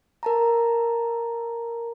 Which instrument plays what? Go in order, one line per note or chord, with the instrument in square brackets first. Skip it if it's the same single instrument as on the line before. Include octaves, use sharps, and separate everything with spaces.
[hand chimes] A#4 A5 A#5